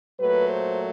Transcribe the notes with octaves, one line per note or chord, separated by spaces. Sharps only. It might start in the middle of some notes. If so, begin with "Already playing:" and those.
A#2 F#3 A3 B4
C5